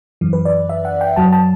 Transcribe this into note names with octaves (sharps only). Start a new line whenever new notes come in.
F#2 E3
B4
D5
E5
F#5
G5
F#2 F#3 A5
A5